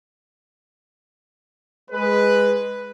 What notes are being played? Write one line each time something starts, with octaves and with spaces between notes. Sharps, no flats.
G#3 B4